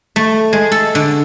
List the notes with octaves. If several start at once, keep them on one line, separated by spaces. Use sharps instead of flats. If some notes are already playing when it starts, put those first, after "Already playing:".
A3
G#3
A4
D3